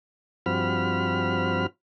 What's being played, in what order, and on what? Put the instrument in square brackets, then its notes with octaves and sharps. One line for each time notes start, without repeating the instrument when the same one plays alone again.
[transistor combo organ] G2 F3 C4 F#4 B5 F6